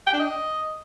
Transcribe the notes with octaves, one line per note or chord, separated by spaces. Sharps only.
G5
D4
D#5